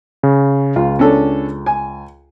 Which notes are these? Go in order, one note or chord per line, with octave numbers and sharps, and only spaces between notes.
C#3
C#2 F4
C#4 D4 A4
G#5